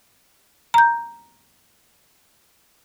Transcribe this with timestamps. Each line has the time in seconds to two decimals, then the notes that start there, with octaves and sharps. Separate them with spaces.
0.74 A#5 G6